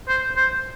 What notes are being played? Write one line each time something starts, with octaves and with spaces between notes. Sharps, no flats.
C5
C5